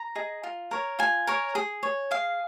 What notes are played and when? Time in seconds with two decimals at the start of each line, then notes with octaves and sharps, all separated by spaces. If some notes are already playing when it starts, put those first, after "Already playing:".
Already playing: A#5
0.16 G#4 D#5
0.43 F4
0.71 A#4 C#5
0.99 F4 G#5
1.27 A#4 C#5
1.55 G#4
1.83 C#5
2.11 G#4 F5